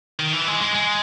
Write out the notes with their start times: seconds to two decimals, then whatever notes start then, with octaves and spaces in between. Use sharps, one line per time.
0.19 D#3
0.33 E3
0.47 G#3
0.61 G#3
0.75 G#3